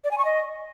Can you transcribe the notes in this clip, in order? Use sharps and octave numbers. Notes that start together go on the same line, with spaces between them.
D5
G#5
C#6
D#5